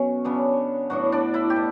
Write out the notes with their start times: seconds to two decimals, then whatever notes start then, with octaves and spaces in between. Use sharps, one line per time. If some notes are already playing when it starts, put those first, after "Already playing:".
Already playing: B2 F#3 C#4
0.25 C#3 F#3 B3 D4
0.90 A2 F#3 B3 D4 F#4
1.12 D4
1.34 E4
1.50 G4
1.56 B2